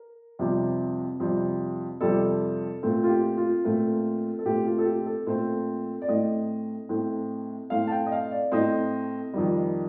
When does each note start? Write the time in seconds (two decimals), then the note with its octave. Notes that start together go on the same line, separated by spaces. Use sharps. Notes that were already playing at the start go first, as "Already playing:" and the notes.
Already playing: A#4
0.39 F2 C3 G3 C4
1.20 F2 C3 G3 C4
2.01 F2 C3 G3 C4 A4
2.83 A#2 A3 C4
3.03 F4
3.09 G4
3.37 F4
3.64 A#2 A3 C4
4.39 A4
4.45 A#2 A3 C4 G4
4.66 F4
4.79 A4
4.85 G4
5.06 A4
5.27 A#2 A3 C4 C5
6.02 D5
6.08 A2 A3 C4 D#5
6.89 A2 A3 C4
7.70 A2 A3 C4 F5
7.87 A5
7.92 G5
8.06 D#5
8.12 F5
8.31 D5
8.52 A2 A3 C4 D#5
9.34 F2 D#3 G3